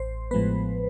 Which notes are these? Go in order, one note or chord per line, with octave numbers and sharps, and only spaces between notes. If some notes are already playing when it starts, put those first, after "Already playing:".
Already playing: A1 C5
A2 F3 G#3 B3 B4